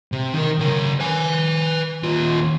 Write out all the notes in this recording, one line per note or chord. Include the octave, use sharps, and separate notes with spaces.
C3
D#3 A#4
C#3 A#4
B4 G#5
D#2 F4